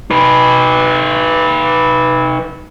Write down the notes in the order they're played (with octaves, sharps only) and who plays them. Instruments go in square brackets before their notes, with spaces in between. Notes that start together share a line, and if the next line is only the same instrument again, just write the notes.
[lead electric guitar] D#4 B4